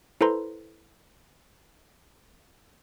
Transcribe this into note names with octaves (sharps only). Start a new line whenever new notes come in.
E4 A4 B4 C5 A#5 C6